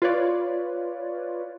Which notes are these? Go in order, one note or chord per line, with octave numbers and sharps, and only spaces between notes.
F4 B4 C#5 D5